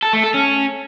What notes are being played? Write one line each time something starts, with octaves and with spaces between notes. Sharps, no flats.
A4
A3
A4
C#4